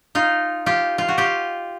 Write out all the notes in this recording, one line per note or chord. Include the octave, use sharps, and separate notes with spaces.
D#4 F4
F4 G4
F4
F#4
F4 G4